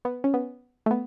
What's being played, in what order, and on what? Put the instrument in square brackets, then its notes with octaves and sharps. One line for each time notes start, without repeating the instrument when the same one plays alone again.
[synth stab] B3
C#4
B3
A3
B3